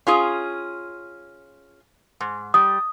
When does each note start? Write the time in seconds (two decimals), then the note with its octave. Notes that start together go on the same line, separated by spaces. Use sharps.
0.07 C#4 F4 G#4
2.21 G#2
2.54 G3 D#6